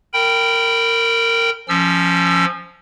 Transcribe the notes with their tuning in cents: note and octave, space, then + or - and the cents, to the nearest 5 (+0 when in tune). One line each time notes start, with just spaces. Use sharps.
A#4 -20 G5 -5 B5 +0
F3 +0 C#4 +0 E6 +25